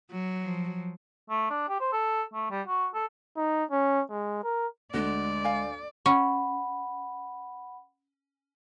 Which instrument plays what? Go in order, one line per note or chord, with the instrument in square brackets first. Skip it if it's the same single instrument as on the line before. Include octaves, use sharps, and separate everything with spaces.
[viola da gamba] F#3
[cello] F3
[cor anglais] A3
D4
G4
C5
A4
A3
G3
F#4
A4
[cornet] D#4
C#4
G#3
A#4
[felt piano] D2 [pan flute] G#3 [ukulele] F#4 [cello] D5
[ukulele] F5 G#5
[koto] C#4 [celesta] F#5 B5